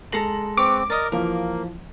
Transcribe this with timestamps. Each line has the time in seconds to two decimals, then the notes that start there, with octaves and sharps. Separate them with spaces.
0.12 G#3 A4 A#5 C6 A#6 F#7
0.57 C4 B4 C#5 D6
0.90 A#4 D5 D#5
1.12 E3 F3 A#3 A#4